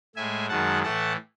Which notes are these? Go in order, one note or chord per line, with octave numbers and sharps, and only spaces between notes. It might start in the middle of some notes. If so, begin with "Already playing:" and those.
A2 G#3 E5 G#5
F#2 D#3 G#3 F#5 A5
A2 E3 A3 F#5 A5